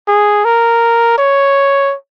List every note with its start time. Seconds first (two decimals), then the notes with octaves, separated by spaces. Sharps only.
0.08 G#4
0.45 A#4
1.18 C#5